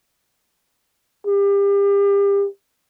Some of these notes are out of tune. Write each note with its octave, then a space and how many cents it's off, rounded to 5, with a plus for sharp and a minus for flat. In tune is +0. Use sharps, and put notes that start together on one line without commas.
G4 +35